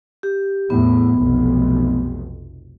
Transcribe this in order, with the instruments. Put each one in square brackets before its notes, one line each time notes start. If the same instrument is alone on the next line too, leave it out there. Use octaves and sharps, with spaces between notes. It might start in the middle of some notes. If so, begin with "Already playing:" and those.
[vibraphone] G4
[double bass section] E2 A2 [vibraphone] B3
[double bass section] F1 B1 F2